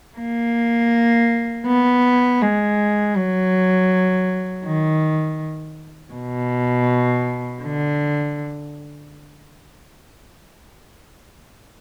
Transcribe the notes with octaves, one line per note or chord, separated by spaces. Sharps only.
A#3
B3
G#3
F#3
D#3
B2
D3